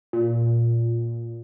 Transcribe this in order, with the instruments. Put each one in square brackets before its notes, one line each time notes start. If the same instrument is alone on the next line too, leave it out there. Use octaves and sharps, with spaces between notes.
[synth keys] A#2